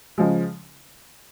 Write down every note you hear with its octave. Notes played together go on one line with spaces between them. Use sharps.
C#3 F3 G#3